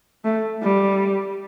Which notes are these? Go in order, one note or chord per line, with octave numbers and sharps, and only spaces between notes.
A3
G3